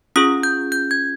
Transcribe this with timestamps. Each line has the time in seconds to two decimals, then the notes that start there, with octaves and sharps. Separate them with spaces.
0.16 C#4 F4 G#4 D#6
0.43 G6
0.72 G6
0.91 G#6